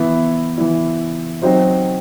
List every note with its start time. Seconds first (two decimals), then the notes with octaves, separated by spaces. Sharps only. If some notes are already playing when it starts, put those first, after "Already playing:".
Already playing: E3 B3 E4
0.58 E3 B3 E4
1.42 F#3 C4 D#4 F#4 C5